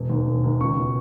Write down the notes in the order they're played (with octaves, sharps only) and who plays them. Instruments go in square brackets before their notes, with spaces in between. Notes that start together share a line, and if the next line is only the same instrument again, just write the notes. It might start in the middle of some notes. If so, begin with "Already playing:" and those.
Already playing: [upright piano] E1
D#2 D#3
E1
D#2 D#3
C#2 C#6
B2